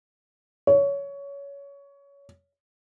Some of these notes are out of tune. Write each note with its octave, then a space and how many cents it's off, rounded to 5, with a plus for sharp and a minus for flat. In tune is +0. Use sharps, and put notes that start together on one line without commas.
C#5 +20